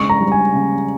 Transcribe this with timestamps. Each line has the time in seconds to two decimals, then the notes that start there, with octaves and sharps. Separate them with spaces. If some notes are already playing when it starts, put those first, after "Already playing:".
Already playing: C#3 G#3 C#6
0.09 A#5
0.20 G3
0.32 G#5
0.54 C#3